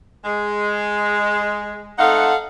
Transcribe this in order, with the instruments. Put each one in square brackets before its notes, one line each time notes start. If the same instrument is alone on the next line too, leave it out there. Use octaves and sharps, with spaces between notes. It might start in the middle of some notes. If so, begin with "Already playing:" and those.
[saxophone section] G#3
[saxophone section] A3 C4 D#4 [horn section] A4 F5 F#5